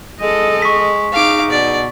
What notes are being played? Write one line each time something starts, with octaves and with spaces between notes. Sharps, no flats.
G#3 A4 D#5
C#6 B6
D#4 G#4 F5 D6
B2 D5